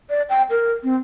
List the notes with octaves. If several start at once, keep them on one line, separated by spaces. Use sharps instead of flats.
D5
G5
A#4
C4